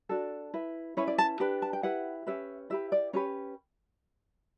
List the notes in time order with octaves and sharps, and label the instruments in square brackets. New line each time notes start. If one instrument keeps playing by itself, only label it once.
[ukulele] D4 F#4 A4
E4 B4
C#4 E4 B4 C#5
D5
A5
D4 G4 B4
A5
G5
E4 G4 B4 F#5
C#4 G4 B4 E5
E4 G4 B4 E5
D5
C#4 G4 B4 C#5